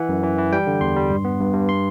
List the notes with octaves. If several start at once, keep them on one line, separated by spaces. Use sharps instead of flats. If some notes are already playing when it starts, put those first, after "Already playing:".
Already playing: E3 F#5
F#2
E3
E3
G3 G5
D3
E2 C6
G3
G2
B3
G2
G2
C6